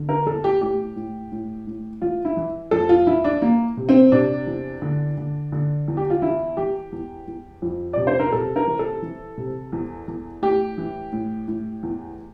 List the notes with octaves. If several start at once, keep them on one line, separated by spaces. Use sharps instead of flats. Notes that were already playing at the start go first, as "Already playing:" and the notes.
Already playing: D3
A#4
E2 A4
G4
A2 G4
A2
A2
A2
E3 F4
E4
E3
F2 A4
F4
E3 E4
D4
E3 A#3
C3
C4
C3 D4
E2
D3
D3
D3
E2
G4
F4
E3 E4
E3 G4
E2
E2
F2
C3 D5
C5
A#4
C3 A4
A#4
E3
A4
E3
C3
E2
E2
A2 G4
E3
A2
A2
E2